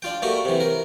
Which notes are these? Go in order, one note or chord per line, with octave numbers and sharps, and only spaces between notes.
D4 F4 G5
A3 A#3 F#4 G4
C3 E3
A#4